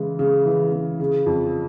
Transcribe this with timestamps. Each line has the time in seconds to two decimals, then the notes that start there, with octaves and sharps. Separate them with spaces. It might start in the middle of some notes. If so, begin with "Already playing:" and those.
Already playing: C#3 E3 G#3
0.19 C#3
0.46 E3
0.72 C#3
1.00 C#3
1.26 F2